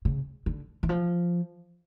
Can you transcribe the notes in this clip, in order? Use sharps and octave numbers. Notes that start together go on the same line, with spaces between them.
C#3
D3
E3
F3